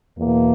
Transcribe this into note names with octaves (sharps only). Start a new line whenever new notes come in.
E2 B2 A#3